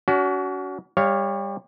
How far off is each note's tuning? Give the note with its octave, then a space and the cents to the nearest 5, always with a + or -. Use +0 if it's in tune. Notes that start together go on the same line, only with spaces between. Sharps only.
C#4 +40 F#4 +15
G3 +25 C#5 +0 F5 +0